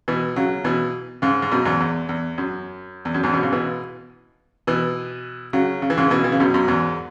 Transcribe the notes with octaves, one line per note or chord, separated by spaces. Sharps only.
B2 E3
C#3 F#3
B2 E3
G#2 C#3
G#2
F#2 B2
E2 G#2
E2
E2
F#2
E2
F#2
E2 G#2
F#2 B2
G#2 C#3
B2 E3
B2 E3
C#3 F#3
C#3
E3
G#2 C#3
B2 E3
E3
C#3
F#2 B2
F#2 B2
E2 G#2